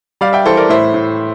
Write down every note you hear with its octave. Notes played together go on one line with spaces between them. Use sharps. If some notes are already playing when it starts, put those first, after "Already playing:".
G3 D5 F5
E5 G5
E3 A4 C5
A#4 D5
A2 C5 E5
A2